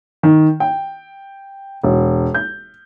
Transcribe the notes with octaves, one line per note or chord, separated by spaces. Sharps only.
D#3
G5
E1
G6